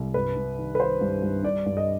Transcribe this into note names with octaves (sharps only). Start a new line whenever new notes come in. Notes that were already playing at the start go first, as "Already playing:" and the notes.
Already playing: C2
G2 B4
G2
D#3
B4
D#3 C5
G2
G2
G2 D5
G2
D#5